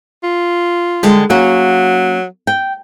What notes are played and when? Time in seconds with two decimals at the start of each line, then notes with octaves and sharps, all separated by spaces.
0.23 F4
1.03 D3 G3 G#3
1.30 F#3 A#3 C#4 F#4
2.47 G5